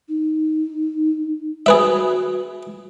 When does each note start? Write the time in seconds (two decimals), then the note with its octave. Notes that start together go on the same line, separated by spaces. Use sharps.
0.08 D#4
1.66 F#4 G#4 B4 E5